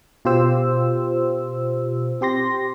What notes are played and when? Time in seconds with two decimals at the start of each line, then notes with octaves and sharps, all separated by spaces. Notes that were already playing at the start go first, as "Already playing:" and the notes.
0.25 B2 F4 G4 C5 E6
2.21 C4 G4 C6 A#6